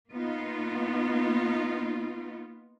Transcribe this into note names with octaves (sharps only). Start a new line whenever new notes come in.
A#3 B3 D#4 F4